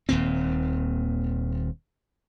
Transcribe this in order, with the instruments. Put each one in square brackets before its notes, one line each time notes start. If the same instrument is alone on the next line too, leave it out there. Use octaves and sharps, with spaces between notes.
[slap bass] D#1 D#2 A#2 C4